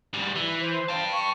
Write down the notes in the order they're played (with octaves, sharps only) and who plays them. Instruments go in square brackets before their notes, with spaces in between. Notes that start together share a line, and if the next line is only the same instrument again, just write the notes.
[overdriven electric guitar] G#2 G3
E3
[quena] C5
[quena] F5 [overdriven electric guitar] G5 A5
[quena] C#6